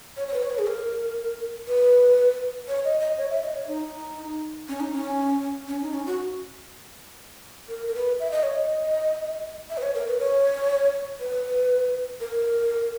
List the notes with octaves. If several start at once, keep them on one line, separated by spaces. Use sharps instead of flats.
C#5
C#5
B4
C#5
B4
G#4
A#4
B4
C#5
D#5
D#5
C#5
E5
D#5
C#5
D#4
C#4
D#4
C#4
C#4
D#4
C#4
F#4
A#4
A#4
B4
E5
D#5
C#5
D#5
E5
B4
C#5
A#4
B4
C#5
B4
A#4